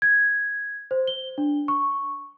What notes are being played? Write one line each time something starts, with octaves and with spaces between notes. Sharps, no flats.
G#6
C5
G7
D4
C#6